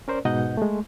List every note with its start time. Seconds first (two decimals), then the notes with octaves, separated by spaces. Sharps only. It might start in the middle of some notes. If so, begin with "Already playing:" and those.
0.08 C#4 A#4 C5 D5
0.25 G#2 B2 D#4 D#5 F#5 G6
0.57 G#3 A3